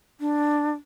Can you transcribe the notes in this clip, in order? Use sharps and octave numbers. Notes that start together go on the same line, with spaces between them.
D4